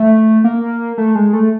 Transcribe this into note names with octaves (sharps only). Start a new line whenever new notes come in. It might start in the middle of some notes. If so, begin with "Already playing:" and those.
Already playing: A3
A#3
A3
G#3
A3